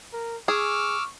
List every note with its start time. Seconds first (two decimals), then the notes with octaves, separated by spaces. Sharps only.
0.13 A#4
0.48 G#4 C#6 D6 E6 F6